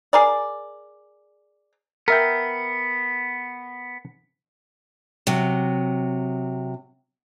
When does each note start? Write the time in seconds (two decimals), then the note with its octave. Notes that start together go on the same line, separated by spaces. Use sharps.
0.13 G#4 A#4 D5
2.08 B3 A#4 E5 G5
5.27 C3 F#3